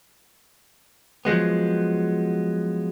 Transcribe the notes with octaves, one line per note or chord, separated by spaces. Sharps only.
F3 F#3 G#3 B3